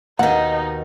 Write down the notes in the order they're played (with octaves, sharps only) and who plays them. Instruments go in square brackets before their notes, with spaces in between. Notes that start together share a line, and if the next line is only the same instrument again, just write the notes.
[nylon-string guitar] D#2 [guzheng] B2 D#3 [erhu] D#4 [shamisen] F#5